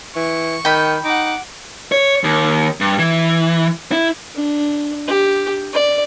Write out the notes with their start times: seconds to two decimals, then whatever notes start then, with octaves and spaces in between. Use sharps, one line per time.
0.16 E3 C#6
0.65 D#3 G5 B5
1.04 D#4 F#5 D6
1.92 C#5
2.24 D#2
2.81 G2
2.99 E3
3.92 E4
4.35 D4
5.07 G4
5.73 D5